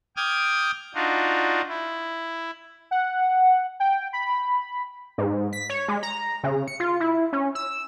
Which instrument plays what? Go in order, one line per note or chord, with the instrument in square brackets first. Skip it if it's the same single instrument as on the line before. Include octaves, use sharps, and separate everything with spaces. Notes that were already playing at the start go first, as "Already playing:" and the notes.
[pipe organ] G5 D6 D#6 F6 G#6
D4 D#4 F4 F#4
E4
[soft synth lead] F#5
G5
B5
[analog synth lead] G#2
B6
C#5
G#3
A#5
C#3
C#7
F4
E4
C#4
E6